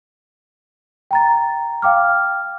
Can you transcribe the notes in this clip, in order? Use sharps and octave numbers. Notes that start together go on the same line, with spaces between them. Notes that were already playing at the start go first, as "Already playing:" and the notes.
G5 A#5 A6
F5 G5 D6 F6